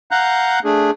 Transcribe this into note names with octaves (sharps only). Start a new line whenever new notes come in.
F5 F#5 A#5 F#6 G6
A3 D4 G#4